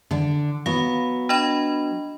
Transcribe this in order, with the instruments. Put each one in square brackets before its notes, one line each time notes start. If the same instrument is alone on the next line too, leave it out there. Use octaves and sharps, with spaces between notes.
[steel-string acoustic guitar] D3 D4
[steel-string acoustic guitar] F#3 B3 [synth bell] F5
[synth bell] D4 D#5 B5